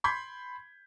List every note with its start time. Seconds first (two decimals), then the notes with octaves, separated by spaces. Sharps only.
0.04 B5 C6 G6 G#6 B6